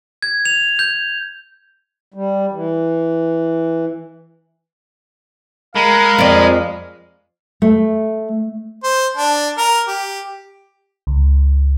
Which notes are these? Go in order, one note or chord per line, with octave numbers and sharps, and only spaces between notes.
G#6
F7
G6
G3
E3
G#3 A#4 F5 B5
F2 D5
A3
C5
D4
A#4
G4
C#2